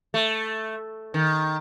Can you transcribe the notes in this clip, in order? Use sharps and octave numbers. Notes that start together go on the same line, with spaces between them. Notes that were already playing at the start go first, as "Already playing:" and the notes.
A3
D#3